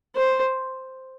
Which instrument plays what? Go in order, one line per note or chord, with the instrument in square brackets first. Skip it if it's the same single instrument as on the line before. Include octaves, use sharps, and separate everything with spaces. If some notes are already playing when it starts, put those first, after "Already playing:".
[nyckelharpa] C5